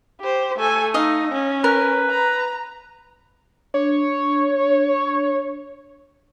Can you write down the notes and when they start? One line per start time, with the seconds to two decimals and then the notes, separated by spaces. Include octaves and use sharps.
0.21 G4 C5
0.58 A3 A4 G#5
0.94 D#4 D#5 F5
1.32 C#4
1.64 A#4 B4
2.10 A#5
3.74 D4 C#5